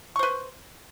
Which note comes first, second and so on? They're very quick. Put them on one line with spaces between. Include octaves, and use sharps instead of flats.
C#6 C5 B4